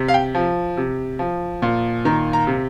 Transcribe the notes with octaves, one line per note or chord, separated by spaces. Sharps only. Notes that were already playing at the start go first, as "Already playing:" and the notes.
Already playing: C3
F5
G5
F3
C3
F3
A#2
D#3 A#5
A#5
C3